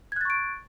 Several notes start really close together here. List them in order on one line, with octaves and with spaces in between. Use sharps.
G#6 F#6 A6 C#6 D7